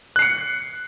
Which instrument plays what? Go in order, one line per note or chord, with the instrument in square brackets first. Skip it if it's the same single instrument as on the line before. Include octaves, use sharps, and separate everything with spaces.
[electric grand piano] F#6
C7
C#7